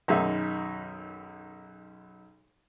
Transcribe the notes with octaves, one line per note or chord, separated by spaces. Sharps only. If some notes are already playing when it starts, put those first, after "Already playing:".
B1 F#2 D#3 D#4 G#4 E5